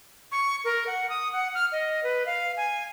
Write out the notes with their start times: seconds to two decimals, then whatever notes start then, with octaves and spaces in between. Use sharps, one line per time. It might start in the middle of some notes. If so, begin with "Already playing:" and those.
0.32 C#6
0.65 A#4
0.87 F#5
1.10 D#6
1.32 F#5
1.55 F6
1.72 D#5
2.03 B4
2.26 F5
2.57 G#5